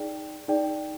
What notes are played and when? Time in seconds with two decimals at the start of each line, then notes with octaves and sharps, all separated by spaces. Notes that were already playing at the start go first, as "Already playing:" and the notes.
Already playing: D#4 G#4 D5 G5
0.48 D#4 G#4 D5 G5